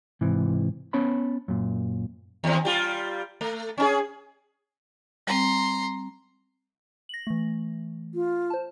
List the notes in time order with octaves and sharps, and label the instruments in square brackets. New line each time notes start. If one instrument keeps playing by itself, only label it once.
[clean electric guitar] G#2 C3 E3
B3 C#4 C#5 A5 B5
F#2 A#2
[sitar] D#2 C4
G3 F4
A3
C#4 D4 G#4
[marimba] G3 C4 [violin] A#5 C6
[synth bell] A#6 F#7
E3 A3
[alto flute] F4
[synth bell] C5 A5